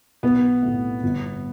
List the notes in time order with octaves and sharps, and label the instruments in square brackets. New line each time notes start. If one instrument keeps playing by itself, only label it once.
[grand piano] B1 [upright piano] B3
[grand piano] A2 A3
G1